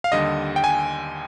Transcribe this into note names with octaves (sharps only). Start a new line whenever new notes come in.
F5
D#2 D3 G3 D#5
G5
G#5